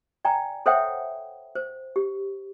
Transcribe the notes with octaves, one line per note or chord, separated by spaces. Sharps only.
D5 G5 G#5 A#5
A4 C5 C#5 E5 F#5 G5
C5
G4